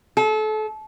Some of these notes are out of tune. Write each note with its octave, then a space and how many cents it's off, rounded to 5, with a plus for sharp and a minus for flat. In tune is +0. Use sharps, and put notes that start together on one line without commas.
A4 -30